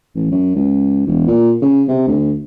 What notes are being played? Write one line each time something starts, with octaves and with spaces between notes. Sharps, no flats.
A1
F#2
C#2
E1
A#2
C#3
C3
D2